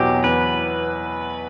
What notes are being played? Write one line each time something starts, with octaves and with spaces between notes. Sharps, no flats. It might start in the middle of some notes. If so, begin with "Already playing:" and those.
Already playing: E2 B2 F#3 G4
E2 B4